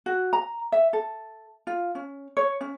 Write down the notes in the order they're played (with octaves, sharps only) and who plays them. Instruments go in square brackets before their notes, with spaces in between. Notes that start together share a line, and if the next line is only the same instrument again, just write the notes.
[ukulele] F#4
A#5
E5
A4
F4
C#4
C#5
C#4